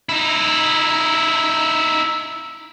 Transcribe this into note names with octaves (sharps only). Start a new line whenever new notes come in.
D#4 E4